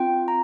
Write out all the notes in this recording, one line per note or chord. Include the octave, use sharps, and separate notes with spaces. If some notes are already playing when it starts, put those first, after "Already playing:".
Already playing: C4 F4 G5
A#5